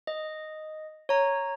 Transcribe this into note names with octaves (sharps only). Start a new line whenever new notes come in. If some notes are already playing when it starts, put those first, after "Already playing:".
D#5
C#5 A#5